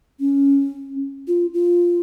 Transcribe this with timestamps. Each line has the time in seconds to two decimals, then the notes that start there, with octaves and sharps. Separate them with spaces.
0.20 C#4
1.28 F4
1.54 F4